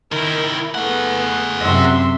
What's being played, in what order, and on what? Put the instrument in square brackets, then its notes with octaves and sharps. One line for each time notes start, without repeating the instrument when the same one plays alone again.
[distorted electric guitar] D#3 E4 [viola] A#4
[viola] A3 B3 [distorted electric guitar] G#4 F#5
[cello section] F#2 C3 E5 [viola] C6